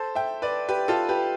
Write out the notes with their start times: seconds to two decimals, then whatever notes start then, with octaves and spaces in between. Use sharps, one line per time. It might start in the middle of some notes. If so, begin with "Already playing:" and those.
Already playing: A4 C5
0.15 E5 G5
0.42 B4 D5
0.69 G4 B4
0.88 F4 A4
1.09 G4 B4